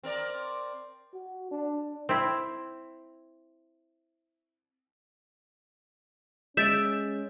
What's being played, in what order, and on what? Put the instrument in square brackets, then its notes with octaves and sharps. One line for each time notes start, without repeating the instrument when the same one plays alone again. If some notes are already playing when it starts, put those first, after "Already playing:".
[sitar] C4 A#4 D5
[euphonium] F#4
D4
[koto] C4 E4
[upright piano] G#3 [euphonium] C#4 [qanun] E5 [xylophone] G6 A6 D7